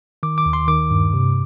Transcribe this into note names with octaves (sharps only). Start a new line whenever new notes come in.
D#3 D6
D6
D#2
C6
D#3 D6
G2
C3